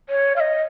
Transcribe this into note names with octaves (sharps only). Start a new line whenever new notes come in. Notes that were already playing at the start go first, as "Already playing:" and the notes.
C#5
F5
D#5